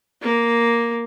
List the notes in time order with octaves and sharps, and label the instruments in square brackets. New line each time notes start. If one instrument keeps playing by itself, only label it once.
[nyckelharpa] A#3